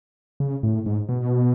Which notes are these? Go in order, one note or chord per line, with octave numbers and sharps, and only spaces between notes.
C#3
A2
G#2
B2